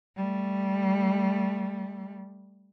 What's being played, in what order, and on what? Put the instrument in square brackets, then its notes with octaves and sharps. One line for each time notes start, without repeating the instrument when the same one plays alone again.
[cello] G3 A3